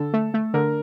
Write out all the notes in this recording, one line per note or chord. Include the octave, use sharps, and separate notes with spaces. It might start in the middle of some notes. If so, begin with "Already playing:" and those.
Already playing: D3 A4
A3
A3
D3 A#4